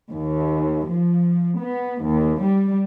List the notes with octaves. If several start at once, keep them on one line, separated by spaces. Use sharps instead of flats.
D#2
F3
B3
D#2
G3